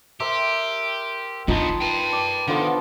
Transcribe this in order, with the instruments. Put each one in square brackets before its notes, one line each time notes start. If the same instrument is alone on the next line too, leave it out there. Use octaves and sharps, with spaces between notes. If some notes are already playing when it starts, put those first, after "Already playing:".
[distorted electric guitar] G4 [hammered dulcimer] A#4 C5 E5
[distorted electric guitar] G2 B3 [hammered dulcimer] D#4 A5 C6 [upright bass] F4
[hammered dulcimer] B4 C6 [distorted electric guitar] G5 A5
[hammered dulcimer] D5
[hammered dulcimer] D3 F3 B3 [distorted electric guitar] D#3